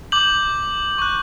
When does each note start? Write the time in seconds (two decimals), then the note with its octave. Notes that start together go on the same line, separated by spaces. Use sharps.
0.12 D6 G6 F#7
0.98 C#6 F#6